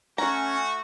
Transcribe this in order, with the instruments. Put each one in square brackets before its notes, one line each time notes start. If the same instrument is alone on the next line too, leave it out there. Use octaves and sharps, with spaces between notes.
[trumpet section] A3 F#4 [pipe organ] C#4 [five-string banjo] A#5